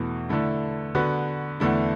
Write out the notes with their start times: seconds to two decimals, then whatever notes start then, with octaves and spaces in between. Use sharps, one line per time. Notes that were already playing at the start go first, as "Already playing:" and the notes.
Already playing: E2 B2 A3 E4
0.29 D3 A3 E4
0.95 D3 B3 F#4 B4
1.60 E2 D3 A3 E4